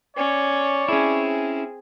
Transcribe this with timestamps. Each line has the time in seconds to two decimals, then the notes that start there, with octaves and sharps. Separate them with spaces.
0.17 C#4 C#5 D5
0.88 C4 C#4 E4 G#4